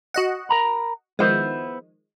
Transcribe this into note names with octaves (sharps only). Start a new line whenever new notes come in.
F#4 D#5 F#5
A#4 A#5 B5
D#3 F3 G#3 B3 E4 C5